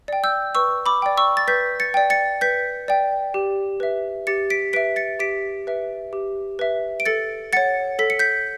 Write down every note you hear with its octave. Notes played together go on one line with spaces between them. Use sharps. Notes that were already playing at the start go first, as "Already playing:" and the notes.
D5 G5
E6 G6
B4 C#6 E6
B5 D6
D5 G5
C#6 E6
A6
B4 G6 B6
A6 C#7
D5 G5
A6 C#7
B4 G6 B6
D5 G5
G4
B4 E5
G4 A6 C#7
B6 D7
B4 E5 B6 D7
A6 C#7
G4 B6 D7
B4 E5
G4
B4 E5
D7
A4 A6 C#7
C#5 F#5 A6 C#7
A4 B6
C#7
G6 B6